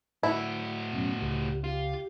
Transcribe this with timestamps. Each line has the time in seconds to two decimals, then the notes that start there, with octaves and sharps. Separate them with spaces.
0.23 A2 E4 F#4
0.93 F#2 B2 C#4
1.21 C#2 G4
1.64 F4 G4